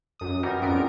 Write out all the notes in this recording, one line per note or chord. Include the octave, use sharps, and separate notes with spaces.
F#2 D#6
E3 G3 D#4 F#4 A#4
F2 G#2 G3 B3 C#4 A#4 D7